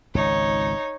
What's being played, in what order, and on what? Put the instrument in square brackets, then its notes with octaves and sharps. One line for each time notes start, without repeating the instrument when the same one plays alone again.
[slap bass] G#1 C#2 [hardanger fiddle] D#4 C#5